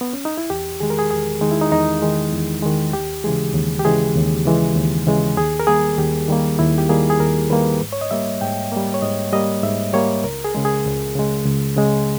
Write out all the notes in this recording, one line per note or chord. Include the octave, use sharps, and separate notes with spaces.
B3
C#4
D#4
E4
E2 G4
D#3 G#3 G#4
A#4
G#4
E2 G#4
D#3 G#3 D#4
E4
D#4
E2 D#4
D#3 G#3
E2
D#3 G#3
D#2 G4
C#3 E3 G#3 G#4
D#2
G4
C#3 E3 G#3 G#4
D#2
C#3 E3 G#3
D#2
C#3 E3 G#3
D#2 G#4
A#4
D#3 G3 A#3 G#4
D#2 G4
D#3 G3 A#3
D#2 E4
G4
D#3 G3 A#3 G#4
G#4
D#2 A#4
D#3 G3 A#3 B4
G#2
C#5
D#5
G3 A#3 E5
G#2 G5
G3 A#3
C#5
G#2 D#5
G3 A#3 D#5
G#2 E5
G3 A#3 C#5
C#2 A#4
G#4
C#3 G#3
G#4
C#2
C#3 G#3
C#2
C#3 G#3